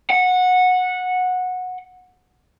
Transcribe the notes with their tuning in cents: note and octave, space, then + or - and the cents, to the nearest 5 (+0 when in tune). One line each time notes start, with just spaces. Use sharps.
F#5 -15